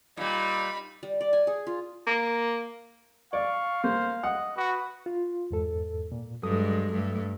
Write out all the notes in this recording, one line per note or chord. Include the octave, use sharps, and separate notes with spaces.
A#2 G3 D#4 B5
G3
D5
G#5
G#4
F4
A#3
D5 F5 C#6
A#3 C5
D#5 F#5
F#4 B4
F4
E2 G#2 A4
A#2
G2 F#3 G#3 A4 D#6
G2 A3